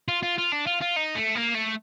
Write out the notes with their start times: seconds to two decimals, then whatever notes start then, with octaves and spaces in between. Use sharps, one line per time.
0.08 F4
0.23 F4
0.38 F4
0.52 D4
0.66 F4
0.81 F4
0.96 D#4
1.16 A3
1.36 A#3
1.55 A3